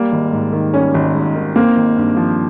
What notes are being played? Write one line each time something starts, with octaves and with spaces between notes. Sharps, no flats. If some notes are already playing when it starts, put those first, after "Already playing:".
Already playing: G3 A#3
G#1
G#2
D#3
G3 C#4
G#1
G#2
D#3
A#3 C4
G#1
G2
F3